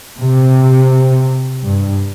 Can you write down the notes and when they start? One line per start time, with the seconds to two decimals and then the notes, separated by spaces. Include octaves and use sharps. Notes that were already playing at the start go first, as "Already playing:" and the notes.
0.18 C3
1.64 G2